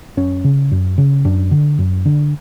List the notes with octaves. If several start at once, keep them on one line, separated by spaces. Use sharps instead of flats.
F#2 C#4
C#3
F#2
C#3
F#2 D4
D3
F#2
D3